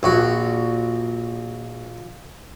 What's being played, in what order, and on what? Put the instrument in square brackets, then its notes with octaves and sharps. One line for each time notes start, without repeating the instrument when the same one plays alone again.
[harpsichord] A#1 F#4